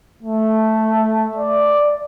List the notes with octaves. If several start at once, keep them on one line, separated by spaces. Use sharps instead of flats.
A3
D5